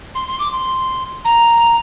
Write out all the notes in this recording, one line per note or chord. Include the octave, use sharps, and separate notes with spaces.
C6
C6
D6
C6
A#5